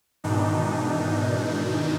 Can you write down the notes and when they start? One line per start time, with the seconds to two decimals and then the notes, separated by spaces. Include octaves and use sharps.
0.24 G#2 B2 D#3 E3 D4 D#4